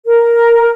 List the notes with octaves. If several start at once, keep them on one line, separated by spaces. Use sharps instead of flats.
A#4